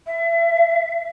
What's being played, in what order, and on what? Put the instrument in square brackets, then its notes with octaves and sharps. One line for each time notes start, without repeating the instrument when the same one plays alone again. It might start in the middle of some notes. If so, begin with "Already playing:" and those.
[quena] E5